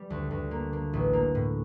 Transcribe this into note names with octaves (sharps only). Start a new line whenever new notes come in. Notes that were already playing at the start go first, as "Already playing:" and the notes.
Already playing: G3
D2
D2
A#3
A#3
A1
A#3
A2